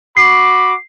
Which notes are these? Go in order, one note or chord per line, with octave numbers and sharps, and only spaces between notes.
F#4 B5 D6 C7